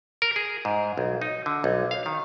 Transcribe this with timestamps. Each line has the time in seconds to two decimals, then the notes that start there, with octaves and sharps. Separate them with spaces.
0.22 A#4
0.36 G#4
0.65 G#2
0.97 B1
1.21 D#4
1.46 D3
1.64 B1
1.91 F5
2.06 D#3